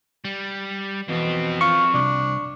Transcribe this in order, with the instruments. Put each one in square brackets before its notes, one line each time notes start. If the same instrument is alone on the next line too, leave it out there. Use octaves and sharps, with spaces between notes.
[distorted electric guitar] G3
[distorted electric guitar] F2 C4 [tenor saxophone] B2 [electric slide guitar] E3
[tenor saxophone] F4 [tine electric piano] C#6
[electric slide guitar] C3 G3 [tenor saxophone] D4